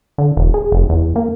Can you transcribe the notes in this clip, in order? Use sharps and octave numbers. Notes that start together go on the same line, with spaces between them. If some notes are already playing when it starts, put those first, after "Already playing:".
D3
E1
G#4
F1
E2
A#3